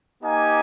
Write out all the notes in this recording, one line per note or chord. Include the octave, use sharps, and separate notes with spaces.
A#3 D#4 G4 G#5